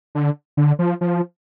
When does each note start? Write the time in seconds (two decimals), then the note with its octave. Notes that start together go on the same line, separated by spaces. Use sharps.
0.15 D3
0.57 D3
0.79 F3
1.01 F3